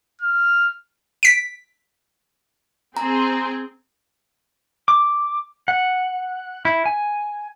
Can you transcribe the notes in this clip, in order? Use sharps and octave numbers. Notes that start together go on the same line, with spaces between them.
F6
B6 D7
C4 G#4 A#5
D6
F#5
E4
G#5